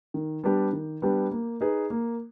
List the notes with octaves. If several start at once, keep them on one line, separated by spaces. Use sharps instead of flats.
D#3
G3 B3 D4 G4
D#3
G3 B3 D4 G4
A#3
D#4 G#4 B4
A#3